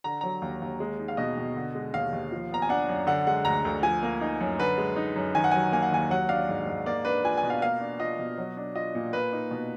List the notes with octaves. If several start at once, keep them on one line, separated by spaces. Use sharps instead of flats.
D3 A#5
F#3 A#5
D#2
D#2
G#3
D#4
F5
B2 D#5
B2
D3
G#3
D#2 F5
D#2
F3
B3 A#5
G#5
D4 F#5
F#2
D3 F#5
G#3 F#5
D2 A#5
D2
F3 G#5
A#3
D#4
F#2
D3 B4
G#3
D#4
F#2
D#3 G#5
F#5
F#3 G#5
A#3 G#5
F#5
D#2 G#5
F#3 F#5
D4 F5
G#2
G#2
A#3 D5
D4 B4
F4 G#5
G#5
B2
F5
A#3 F5
D4
F4 D#5
B2
F#3
D4
F4 D#5
A#2
A#3 B4
D#4
B2